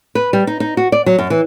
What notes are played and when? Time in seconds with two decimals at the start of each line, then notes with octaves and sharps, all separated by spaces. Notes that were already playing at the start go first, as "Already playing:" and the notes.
0.15 B4
0.33 G3
0.47 D#4
0.60 D#4
0.77 F#4
0.92 D5
1.06 F#3
1.19 F#2
1.30 E3